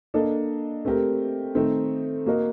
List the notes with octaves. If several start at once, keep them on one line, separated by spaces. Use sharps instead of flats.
A#3 D4 A4 D#5
A3 C4 G4 A#4
D#3 A3 C4 D#4
A#3 F#4 A#4 D#5